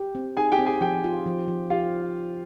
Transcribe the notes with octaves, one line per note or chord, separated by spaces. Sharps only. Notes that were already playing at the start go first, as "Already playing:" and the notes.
Already playing: G4
C4
D#4 G#4 G#5
G4 G5
C4
G#4 G#5
F3 G4 G5
F4
F3
F3
F4 G4 F5